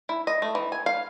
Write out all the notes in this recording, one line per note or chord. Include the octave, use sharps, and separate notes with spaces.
E4
D#5
A3
E3
G#5
F5